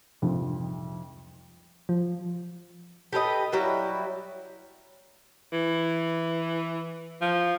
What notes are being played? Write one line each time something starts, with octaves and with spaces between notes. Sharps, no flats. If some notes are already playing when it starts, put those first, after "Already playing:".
C2 F2 G#2 F3
F3
G4 A4 B4 D#5
F#3 G3 E4 F#4
E3
F3